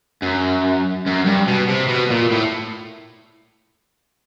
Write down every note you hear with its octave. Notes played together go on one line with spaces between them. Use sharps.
F#2
F#2
G2
B2
C3
B2
A#2
A2